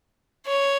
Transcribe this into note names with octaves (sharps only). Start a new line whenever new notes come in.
C#5